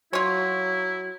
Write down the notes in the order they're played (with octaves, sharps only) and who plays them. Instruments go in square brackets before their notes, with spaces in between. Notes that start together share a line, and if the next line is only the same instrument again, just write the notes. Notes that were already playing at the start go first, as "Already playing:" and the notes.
[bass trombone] F#3 [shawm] E4 [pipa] F4 C#5